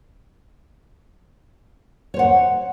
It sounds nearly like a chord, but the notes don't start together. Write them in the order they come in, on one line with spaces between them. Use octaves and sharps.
C#5 C5 F#5